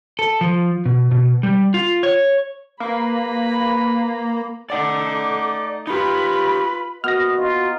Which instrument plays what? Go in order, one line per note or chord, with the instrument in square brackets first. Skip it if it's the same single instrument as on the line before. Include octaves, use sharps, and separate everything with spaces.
[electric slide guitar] A4
F3
B2
B2
G3
F4
C#5
[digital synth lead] A#3 [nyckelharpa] B4 B5
[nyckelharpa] A3 D#4 [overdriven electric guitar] D5 F#5 [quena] D6
[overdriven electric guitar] D#4 G4 [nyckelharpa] F4 B4 [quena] B5
[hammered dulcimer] B3 [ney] F#4 [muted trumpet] D#5 [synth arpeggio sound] F6 A#6
[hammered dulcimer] D#4 [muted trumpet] F4